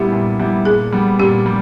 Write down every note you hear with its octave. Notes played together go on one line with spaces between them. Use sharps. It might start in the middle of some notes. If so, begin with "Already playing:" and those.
Already playing: A#2 G3 B3 E4 G4
A#2
G3 B3 E4
A#2 G#4
G3 B3
A#2 G4
G3